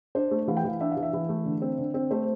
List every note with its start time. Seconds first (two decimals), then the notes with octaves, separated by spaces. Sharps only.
0.15 D4 C5
0.31 A3
0.48 E3 F5
0.57 G5
0.64 E3 F5
0.80 D4 E5
0.91 F5
0.97 E3
1.03 E5
1.13 E3
1.29 A3
1.45 D3
1.62 C4
1.78 D3
1.94 C4
2.11 A3 C5